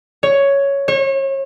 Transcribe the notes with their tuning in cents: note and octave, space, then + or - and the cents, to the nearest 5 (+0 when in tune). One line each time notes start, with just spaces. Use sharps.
C#5 +5
C#5 -35